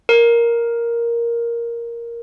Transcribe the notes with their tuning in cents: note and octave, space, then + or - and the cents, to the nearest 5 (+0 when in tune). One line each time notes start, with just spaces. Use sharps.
A#4 +5